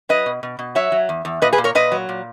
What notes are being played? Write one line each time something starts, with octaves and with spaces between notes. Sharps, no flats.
F#3 B4 D#5
B2
B2
B2
F#3 C#5 E5
F#3
E2
E2
A#2 B4 D#5
G#4 B4
A#2
A#4 C#5
A#2 B4 D#5
F#3
A#2